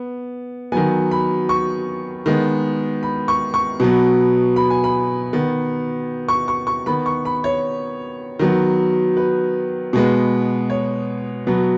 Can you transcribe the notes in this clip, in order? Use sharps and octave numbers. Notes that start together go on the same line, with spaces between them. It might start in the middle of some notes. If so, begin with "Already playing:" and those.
Already playing: B3
D#3 F#3 B3 G#5
B5
C#6
D#3 G#3 B3
B5
C#6
C#6
B2 F#3 B3
B5
G#5
B5
D#3 B3
C#6
C#6
C#6
D#3 B3 B5
C#6
B5
C#5
D#3 F#3 B3
B4
B2 G#3 B3
C#5
B2 F#3 B3